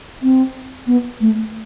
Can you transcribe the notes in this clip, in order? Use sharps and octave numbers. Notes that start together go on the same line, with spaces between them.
C4
B3
A3